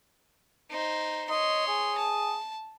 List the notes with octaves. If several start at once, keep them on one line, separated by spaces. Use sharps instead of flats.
D#4 C5
C#5 D#5 C6
G#4
A5